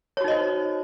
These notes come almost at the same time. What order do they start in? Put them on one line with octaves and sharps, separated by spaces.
C#5 F#4 D#4 D#5 C5